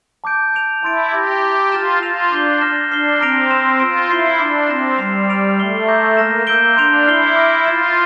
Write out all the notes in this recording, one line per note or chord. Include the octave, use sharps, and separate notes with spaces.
A5 D6 G6 D7
G6 D7 F7
E4 A5 C6 E6 A6 D7
G4 D6 G6 A#6
A#5 E6 G6
F4 F6 A6 E7
F4 E6 A#6 F7
D4 D6 G6 C7 G7
F6 A#6 E7
D4 F6 C7 G7
C4 A#5 F6 A#6 D7 F7
C6 E6 A#6 E7
F4 E6 A#6 D7
E4 G6 C7 G7
D4 D6 A6 C7
C4 C6 E6 A#6 E7
G3 F6 C7 F7
F6 A6 D7 F7
A3 F6 C7 G7
A#5 D6 G6 A#6
A#3 F6 A#6 E7
A#3 E6 G6 D7 G7
D4 C6 G6 D7 F7
E4 F6 C7 G7
D6 F6 A#6 D7
F4 D6 A6 C7 E7